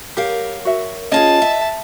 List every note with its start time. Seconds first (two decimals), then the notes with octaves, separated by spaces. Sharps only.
0.17 F#2 G4 A#4 F5
0.65 F#4 E5
1.12 C#4 F4 G#4 D#5 A5
1.42 E5